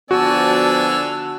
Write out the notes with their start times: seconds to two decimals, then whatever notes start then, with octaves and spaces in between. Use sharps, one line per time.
0.11 D3 F3 B3 F#4 D5 G#5 A5 E6